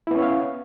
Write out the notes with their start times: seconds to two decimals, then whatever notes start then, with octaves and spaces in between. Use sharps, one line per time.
0.07 E4
0.11 B3
0.15 C#4
0.18 C#5
0.22 F5